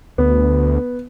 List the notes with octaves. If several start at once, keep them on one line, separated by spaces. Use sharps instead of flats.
D2 B3